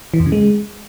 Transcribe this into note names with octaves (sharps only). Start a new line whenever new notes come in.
E3
F2
C#3
G#3